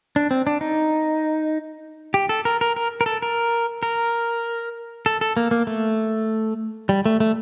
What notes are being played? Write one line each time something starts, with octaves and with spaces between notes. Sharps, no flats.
D4
C4
D4
D#4
G4
A4
A#4
A#4
A#4
A#4
A4
A#4
A#4
A4
A4
A#3
A#3
A3
G3
A3
A3